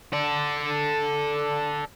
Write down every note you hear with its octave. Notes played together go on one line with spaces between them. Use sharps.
A4 D5